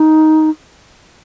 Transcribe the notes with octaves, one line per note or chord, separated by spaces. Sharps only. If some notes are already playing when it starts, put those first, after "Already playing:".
Already playing: D#4